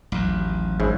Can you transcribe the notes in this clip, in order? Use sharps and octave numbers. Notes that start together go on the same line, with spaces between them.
A1 D#2 F#3
G#1 G#2 C#4 E4